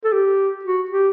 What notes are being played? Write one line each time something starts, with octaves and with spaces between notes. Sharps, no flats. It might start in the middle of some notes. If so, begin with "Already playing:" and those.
A4
G4
F#4
G4